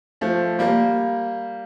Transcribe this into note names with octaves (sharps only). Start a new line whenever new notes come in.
F3 A3
G3 A#3